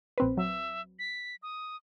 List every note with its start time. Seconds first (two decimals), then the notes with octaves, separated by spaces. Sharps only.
0.18 A#1 C4 B4
0.37 F#3 E5
0.99 B6
1.43 D#6